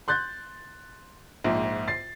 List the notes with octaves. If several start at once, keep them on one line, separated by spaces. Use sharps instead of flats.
C6 F#6 G6 A6
A#1 G#2
A6 C7